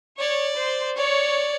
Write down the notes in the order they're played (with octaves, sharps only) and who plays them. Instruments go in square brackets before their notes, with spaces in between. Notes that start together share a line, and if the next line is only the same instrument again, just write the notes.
[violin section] C#5 [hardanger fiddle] D5
[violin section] C5
[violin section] C#5 [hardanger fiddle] D5